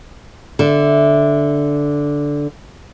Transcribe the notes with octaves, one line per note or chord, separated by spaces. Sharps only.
D3 E5